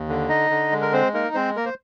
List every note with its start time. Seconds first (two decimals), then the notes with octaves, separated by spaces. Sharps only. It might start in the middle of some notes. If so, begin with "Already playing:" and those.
Already playing: D#2
0.09 D3
0.29 D#4 D#5
0.50 D3
0.72 G#3
0.81 A#4
0.93 C4 C5
1.14 A#3 D#4 A#4
1.35 G#3 C4 C5
1.56 A#3 A#4
1.66 C5